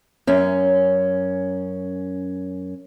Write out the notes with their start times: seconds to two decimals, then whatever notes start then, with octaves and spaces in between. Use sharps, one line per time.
0.27 F#2 C#4